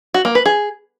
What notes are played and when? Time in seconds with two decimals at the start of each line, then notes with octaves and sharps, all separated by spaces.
0.14 F#4
0.25 A#3
0.35 B4
0.46 G#4